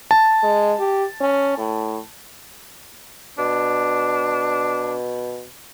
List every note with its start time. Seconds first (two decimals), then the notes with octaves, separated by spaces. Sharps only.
0.11 A5
0.43 G#3
0.79 G4
1.21 C#4
1.58 A2
3.39 B2 D4